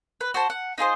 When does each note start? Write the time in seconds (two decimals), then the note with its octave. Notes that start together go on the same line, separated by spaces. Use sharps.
0.21 B4
0.34 F#4 C5 A5
0.50 F#5
0.78 D#4 F4 G#4 C5